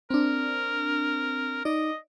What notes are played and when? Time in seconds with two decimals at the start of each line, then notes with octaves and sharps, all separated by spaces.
0.10 C4 D4 A#4
1.65 D#4 D5 D#5